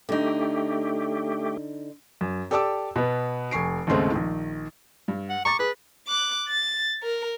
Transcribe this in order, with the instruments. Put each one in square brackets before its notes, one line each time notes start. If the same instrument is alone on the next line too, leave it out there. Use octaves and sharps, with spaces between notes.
[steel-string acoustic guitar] D3 D#4 [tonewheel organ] A3 G4
[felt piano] F#2
G4 A4 D5 A5 D6 E6
B2 B3
F1 G#5 C#6 C7 D7
D#2 G#2 C#3 G#3 A3 C4
A#1 D#3
[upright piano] G2
[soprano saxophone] F#5
[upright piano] A#5 D6 A6 [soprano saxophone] C#6
[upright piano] G#4 [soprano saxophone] B4
[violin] D6 F#6
A6
A#4